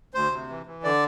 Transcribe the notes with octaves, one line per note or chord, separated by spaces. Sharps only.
D2 C5
C3
E3
E3
D3 D5